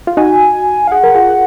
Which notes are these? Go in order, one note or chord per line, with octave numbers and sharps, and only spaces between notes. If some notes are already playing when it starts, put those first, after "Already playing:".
F4
D#4 F#4 G#5
F5
G#4 F#5
A#4
F4 G#4